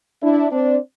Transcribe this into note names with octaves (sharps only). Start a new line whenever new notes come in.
D4 E4
C4 D4